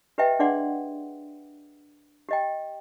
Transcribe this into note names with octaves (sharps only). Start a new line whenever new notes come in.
G4 B4 D#5 E5 G5
D4 G#4 D5 F#5 C6
G4 D#5 G5